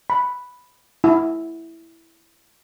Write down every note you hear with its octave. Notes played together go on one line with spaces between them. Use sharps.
B5
E4